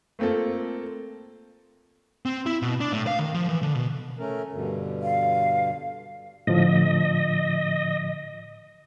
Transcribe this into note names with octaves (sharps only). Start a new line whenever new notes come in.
A3 A#3 C4 F4 A4
C4
E4
B2
D4
A2
F5
D#3
F3
E3
D3
B2
A3 C#4 A#4
G2 B2 D3
F5
A2 D3 F3 D#5